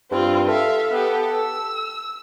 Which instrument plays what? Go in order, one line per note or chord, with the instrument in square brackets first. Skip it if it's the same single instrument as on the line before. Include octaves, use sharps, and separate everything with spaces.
[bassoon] G2 [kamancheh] C4 F4
[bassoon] A4 [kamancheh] E5 F5
[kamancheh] B3 G4
E6